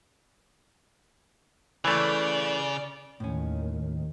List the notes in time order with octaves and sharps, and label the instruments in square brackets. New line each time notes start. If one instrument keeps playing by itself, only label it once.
[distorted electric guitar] C#3 [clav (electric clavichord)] E3 A3 [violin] D5
[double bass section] D#2 D#3 [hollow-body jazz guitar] A2 C#4